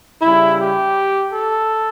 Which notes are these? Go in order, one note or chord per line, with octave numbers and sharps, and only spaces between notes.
C#3 G3 E4
G4
A4